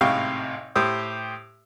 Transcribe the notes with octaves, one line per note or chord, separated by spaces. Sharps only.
G#1 A2 C3 F5 G5 C#6
A2 G4 C5 D#6